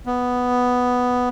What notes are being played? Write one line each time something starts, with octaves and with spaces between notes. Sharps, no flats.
B3